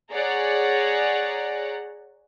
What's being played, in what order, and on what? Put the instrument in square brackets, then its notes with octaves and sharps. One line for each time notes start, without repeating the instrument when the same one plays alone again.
[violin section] G#4 C#5 D5 F#5 A#5